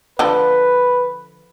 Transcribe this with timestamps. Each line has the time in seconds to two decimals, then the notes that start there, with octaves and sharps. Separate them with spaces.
0.19 D3 F3 A4 B4